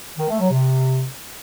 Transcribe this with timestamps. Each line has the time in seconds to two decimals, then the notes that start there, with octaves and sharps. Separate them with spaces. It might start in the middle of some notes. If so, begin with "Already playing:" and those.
0.17 D#3
0.28 A3
0.39 F#3
0.51 C3